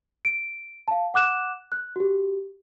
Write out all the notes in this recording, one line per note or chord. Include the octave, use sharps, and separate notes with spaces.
D7
F5 A5
F#5 D6 F#6 E7
F#6
F#4 G4